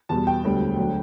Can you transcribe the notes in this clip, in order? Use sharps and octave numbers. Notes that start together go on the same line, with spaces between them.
E2 B2 G3 A5
G5
E1 D2 D3 G3
D2 D3 F#3